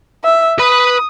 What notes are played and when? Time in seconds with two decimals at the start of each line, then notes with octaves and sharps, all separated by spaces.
0.24 E5
0.59 B4 B5 D#6